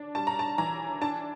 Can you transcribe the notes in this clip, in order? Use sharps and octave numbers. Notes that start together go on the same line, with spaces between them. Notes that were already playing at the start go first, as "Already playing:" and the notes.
Already playing: D4
G3 A5
A#5
A5
E3 A#5
D4 A5